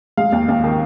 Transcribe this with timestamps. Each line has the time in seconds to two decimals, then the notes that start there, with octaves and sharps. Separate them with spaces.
0.17 G#3 F5
0.32 D#2
0.48 D#2
0.64 D#3